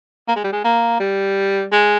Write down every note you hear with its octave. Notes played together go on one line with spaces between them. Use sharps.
A#3
G#3
G3
G#3
A#3
G3
G#3